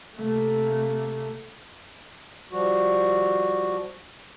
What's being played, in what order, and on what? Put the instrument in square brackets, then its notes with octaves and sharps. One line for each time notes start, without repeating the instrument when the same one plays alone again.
[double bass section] C3 A3 A#3
[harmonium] F3 G3 F#4